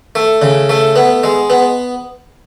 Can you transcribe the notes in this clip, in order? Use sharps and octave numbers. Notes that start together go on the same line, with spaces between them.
A3
C#3
A3
B3
G#3
B3